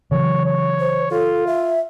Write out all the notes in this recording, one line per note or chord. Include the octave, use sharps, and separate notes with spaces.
C#3 E3 F#3 C#5
C#5
C5
F4 A4
E5